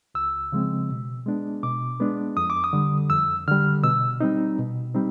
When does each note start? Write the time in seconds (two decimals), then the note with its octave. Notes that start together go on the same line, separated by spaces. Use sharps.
0.15 C#2 E6
0.52 C#3 F3 G#3 C4
0.90 B2
1.26 G#3 B3 D4
1.63 B2 D6
2.00 G#3 B3 D4
2.37 F2 D#6
2.50 D6
2.64 D#6
2.73 D3 G3
3.10 F2 E6
3.47 D3 G3 F6
3.84 B2 E6
4.20 G3 C4 D#4
4.58 B2
4.94 G3 C4 D#4